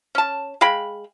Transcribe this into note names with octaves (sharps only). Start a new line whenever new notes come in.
C#4 A5
G#3 F5 G5 B5